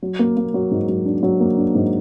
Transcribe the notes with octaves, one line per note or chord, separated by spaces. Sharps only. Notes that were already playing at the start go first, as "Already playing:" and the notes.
F#3
A#3
A#3
F#3
G#2
F#3
D4
F#3
A#3
D4
G#2